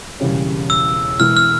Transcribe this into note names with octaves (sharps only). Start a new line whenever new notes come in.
E1 E2 C#3 G3 C#4
E6
E1 E2 E3 G#3 F6
F6